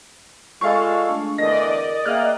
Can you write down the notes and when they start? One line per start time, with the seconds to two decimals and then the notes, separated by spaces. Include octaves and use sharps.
0.61 G#3 F4 A4 D5 F5 G#5 C#6
1.07 A3 D4 A5
1.38 E2 D3 E3 A#4 D5 D#5 A#6
2.05 A#3 G#4 E5 G5 F6 F#6